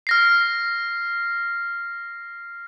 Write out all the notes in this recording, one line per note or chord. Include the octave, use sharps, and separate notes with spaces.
F6 A#6 C7